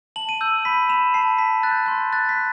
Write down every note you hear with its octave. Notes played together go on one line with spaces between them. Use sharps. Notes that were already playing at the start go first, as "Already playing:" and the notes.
A5 F#7
D#7
E6 G6
B5 B6
B5 E7
A5 C7
A5 B6
F#6 A6
G6
C6 G6
F#6 A6
B6
F#6